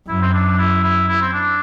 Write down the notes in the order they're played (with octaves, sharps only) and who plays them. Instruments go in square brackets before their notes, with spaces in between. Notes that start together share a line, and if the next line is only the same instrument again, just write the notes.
[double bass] F#2 [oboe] E4
[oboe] C4
D4
E4
E4
E4
C4
D4